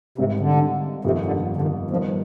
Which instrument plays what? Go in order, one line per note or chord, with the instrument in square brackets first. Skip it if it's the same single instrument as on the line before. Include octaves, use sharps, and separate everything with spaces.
[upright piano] G#1 G#2 G3 [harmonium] C3
[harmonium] D3
[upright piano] G1 F2 D#3 G3 C4 [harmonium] C3
[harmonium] D3
D3
D#3
[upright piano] G1 G2 D#3 G3 [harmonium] F3